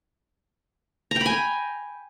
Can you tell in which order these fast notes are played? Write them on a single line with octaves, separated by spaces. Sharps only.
A#5 G5 B5 G#5